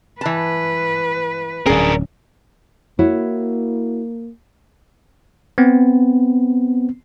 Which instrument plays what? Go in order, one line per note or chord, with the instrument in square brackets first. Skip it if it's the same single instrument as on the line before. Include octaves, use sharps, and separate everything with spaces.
[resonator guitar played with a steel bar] E3 A5 [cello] B4
[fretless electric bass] D1 C#4 [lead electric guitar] D4 A#4 [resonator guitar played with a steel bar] G#4 G#5
[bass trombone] A#3 [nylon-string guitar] E4 F#4 C#5
[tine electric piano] B3 C4